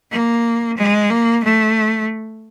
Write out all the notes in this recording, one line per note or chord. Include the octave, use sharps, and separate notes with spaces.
A#3
G#3
A#3
A3